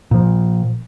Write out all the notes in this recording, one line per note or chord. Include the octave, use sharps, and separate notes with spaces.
A#2 F3